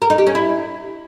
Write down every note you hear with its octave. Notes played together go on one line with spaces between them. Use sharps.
A#4
D#4
G4
C#4
E4